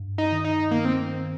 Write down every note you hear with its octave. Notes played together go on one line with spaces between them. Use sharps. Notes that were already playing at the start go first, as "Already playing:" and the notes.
Already playing: G2
D#4
D#3
D#4
D#3 A#3
C4